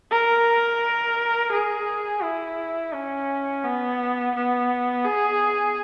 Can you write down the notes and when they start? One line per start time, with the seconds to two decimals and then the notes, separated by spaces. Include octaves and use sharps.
0.11 A#4
1.52 G#4
2.23 E4
2.93 C#4
3.64 B3
4.35 B3
5.04 G#4